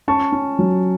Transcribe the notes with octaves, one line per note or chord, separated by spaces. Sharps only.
C#4 A5 C#6
C#4
F#3